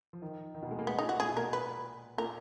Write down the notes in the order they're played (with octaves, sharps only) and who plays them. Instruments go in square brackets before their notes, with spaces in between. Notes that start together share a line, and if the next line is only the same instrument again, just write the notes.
[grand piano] F3
D#3
D#3
B2
G#3
A#3
[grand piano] G#3 [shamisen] B3
[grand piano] A#2 [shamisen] D#4
[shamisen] F#4
[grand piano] A#2 [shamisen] G#4
[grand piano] B2
[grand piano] A#2 [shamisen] A#4
[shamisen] B4
[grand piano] A#2 [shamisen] A#4